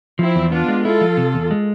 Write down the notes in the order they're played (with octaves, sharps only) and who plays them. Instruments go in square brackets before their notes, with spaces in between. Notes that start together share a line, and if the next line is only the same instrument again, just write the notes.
[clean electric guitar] F3 [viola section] C4 E4
[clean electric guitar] E2
[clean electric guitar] B3 [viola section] D4 F4
[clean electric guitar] G#3
[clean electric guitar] E4 [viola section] F4 A4
[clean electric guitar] F3
C3
E2
G#3